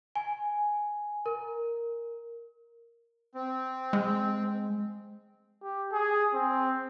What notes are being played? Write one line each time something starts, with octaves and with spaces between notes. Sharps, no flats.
G#5
A#4
C4
G#3
G4
G#4
C4